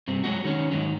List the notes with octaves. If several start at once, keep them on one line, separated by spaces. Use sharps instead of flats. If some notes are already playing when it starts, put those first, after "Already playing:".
G2 C3 C4
F#3 G#3 D#4 F#4
D#3 C#4
G#2 D#3 F#3